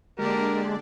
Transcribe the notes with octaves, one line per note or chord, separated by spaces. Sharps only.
D3 G#3 A#3 D4 G4 A#4 D5